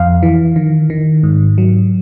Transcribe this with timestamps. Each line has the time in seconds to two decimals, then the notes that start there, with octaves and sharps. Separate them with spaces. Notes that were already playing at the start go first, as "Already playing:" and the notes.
Already playing: F2 F5
0.23 E3
0.56 D#3
0.90 D#3
1.23 G#2
1.58 F#3